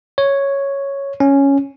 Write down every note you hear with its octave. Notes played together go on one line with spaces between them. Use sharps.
C#5
C#4